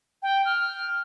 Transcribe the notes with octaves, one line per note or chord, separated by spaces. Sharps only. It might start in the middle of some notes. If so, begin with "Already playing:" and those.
G5
F6